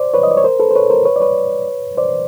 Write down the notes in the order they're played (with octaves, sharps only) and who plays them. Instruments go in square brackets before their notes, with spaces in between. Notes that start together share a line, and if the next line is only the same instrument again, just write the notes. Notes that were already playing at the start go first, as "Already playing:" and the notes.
Already playing: [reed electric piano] C5 D5
B4 C#5
D#5
D5
C#5
A#4 C5
A4 B4
C5
B4 C#5
A#4 C5
B4 C#5
D5
B4 C#5
C5 D5